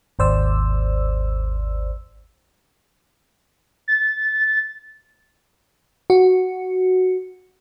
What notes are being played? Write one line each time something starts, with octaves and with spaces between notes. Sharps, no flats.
G#1 D#2 C5 D5 E6
A6
F#4